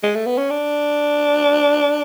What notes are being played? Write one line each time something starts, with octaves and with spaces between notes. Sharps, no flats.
G#3
A3
B3
C#4
D4